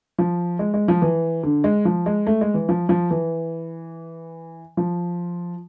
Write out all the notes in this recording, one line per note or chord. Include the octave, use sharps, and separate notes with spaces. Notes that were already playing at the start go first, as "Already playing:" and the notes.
F3
G#3
G#3
F3
E3
D3
G#3
F3
G#3
A3
G#3
E3
F3
F3
E3
F3